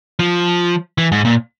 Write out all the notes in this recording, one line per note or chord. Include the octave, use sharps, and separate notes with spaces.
F3
E3
G#2
A#2